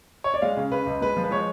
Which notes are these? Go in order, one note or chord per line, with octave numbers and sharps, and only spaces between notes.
C#5
D5
G#3 F5
C#3
C#3 B4
C#2
G#3 B4
F3
B4
G#3 C#5